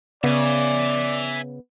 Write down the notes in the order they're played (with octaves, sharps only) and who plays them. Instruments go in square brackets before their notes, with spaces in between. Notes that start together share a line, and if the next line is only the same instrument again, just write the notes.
[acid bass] C#3 [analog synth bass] B3 [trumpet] D5 [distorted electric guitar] E5 G#5